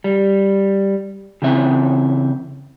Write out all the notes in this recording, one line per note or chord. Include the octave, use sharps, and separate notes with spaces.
G3
C#3 E3 C4 E5